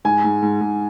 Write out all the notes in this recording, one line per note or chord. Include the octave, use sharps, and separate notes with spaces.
G#2 G#5
G#2
G#2
G#2